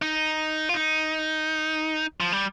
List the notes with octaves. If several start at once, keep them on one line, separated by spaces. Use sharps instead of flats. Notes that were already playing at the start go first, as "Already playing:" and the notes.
D#4
F4
D#4
F3
G3